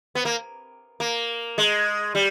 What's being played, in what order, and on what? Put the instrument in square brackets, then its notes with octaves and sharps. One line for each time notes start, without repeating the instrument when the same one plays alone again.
[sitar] B3
A#3
A#3
G#3
G3